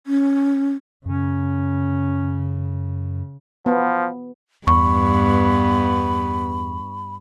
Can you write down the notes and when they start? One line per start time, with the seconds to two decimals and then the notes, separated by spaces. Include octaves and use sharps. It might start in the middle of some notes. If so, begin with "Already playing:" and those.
0.07 C#4
1.05 F#2 C#3 C#4
3.66 F3 B3
4.67 E2 G2 B3 B5 C#6